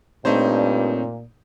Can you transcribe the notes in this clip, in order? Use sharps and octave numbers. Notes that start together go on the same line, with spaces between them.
G2 A#2 A3 C4 D#4 C5 C#5